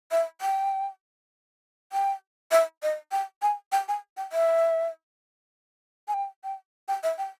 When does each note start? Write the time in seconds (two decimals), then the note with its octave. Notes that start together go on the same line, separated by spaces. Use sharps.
0.11 E5
0.41 G5
1.92 G5
2.52 E5
2.83 D#5
3.12 G5
3.42 G#5
3.72 G5
3.88 G#5
4.17 G5
4.32 E5
6.08 G#5
6.14 G5
6.44 G5
6.88 G5
7.03 E5
7.18 G5